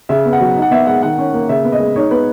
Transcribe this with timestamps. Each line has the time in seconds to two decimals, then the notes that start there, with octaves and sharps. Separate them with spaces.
0.09 C#3 E5
0.26 B3
0.33 F#5
0.41 F#3
0.56 D#4
0.62 F#5
0.71 B3 E5
0.87 G#3 F#5
1.03 D#3 F#5
1.18 C#4
1.34 A#3
1.49 C#3 E5
1.65 B3
1.72 D#5
1.80 G#3
1.96 D#4 C#5
2.11 B3 B4